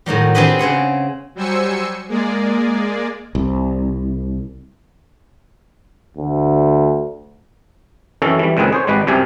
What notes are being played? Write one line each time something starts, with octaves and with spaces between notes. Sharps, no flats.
A2 D#3 F#3 G3
C4 D4 G4 G#4 B4 D#5
C#3 C4 G#4 F#5
F#3 G3 C5 G#5 E6 C#7
G#3 A#3 G#4 D5
C2
D2
F#2 D#3 E3 C#4 A4
E3 G3
C#2 A#2 D#3 C4 G#4 B4
G#4 C5 C#5
G#1 G3 G#3 B4
C2 F#2 C3 G4 G#5